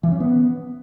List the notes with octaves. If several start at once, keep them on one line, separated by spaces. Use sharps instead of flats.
E3
C#4
B3